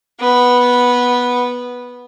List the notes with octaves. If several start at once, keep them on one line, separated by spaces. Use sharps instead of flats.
B3